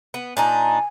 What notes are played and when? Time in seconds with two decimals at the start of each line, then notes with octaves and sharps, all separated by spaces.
0.14 B3
0.37 A#2 D4 D#4 G#5